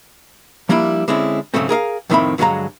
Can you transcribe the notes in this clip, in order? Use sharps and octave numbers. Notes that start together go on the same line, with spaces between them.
F3 G3 A#3 D4 E4
D3 G#3 C4 C#4 E4
G#2 C#3 F#3 A3 C4
G#4 A#4 D#5 F5
F2 A2 D#3 C4 E5 B5
G2 D3 F#3 G#3 F5 A#5